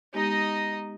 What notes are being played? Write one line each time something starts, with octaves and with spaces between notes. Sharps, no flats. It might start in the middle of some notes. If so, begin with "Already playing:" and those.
G#3 B3 D#4 G4 D#5